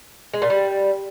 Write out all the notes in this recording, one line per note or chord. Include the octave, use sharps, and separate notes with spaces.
G#3
A#2
G3